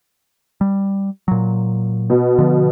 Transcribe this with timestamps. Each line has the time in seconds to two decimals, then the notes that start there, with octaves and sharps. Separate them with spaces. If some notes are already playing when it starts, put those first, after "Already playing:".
0.61 G3
1.28 A#2 F#3
2.10 B2
2.38 D3 F3